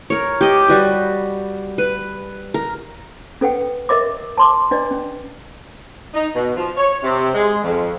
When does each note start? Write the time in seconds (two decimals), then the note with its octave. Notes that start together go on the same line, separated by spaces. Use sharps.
0.10 A#4 C#5
0.41 G4 D#5
0.68 G3 F#4 B4
1.78 B4
2.54 A#4
3.41 C#4 A4 B4 F#5 G5
3.89 A#4 D#5 E5 D6
4.38 A5 C6 D6
4.71 D4 B4 D5 D#5
4.91 C#4
6.14 D#4
6.35 B2
6.57 F3
6.77 C#5
7.03 C3
7.35 G#3
7.64 F2